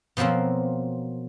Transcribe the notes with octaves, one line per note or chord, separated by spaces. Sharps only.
B2 F3 F#3 A#3 C4